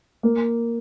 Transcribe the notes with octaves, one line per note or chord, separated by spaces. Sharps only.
A#3